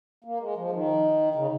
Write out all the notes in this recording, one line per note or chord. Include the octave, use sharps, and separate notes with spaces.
A#3
G#3
F3
D#3
C#3